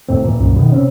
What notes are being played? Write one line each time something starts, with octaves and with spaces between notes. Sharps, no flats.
D#1 A2 A3 C4
A#2 E3
C2 F#2 A#2
B2 D#3
C3 C4 C#4